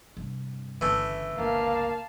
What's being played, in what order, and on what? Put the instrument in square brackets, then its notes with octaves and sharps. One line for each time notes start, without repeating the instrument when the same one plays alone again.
[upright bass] G2 C3
[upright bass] G1 C#3 [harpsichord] E3 A3
[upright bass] G1 C#2 [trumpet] A#3 [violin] F5 A5